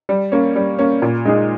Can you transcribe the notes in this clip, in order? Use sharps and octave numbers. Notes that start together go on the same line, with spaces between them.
G3
A#3 C#4
G3
A#3 C#4
A#2
G#3 D#4 G#4